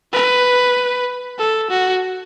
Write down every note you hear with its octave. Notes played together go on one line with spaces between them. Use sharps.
B4
A4
F#4